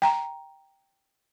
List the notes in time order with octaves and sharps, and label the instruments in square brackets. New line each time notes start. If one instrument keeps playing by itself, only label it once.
[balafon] G5 A#5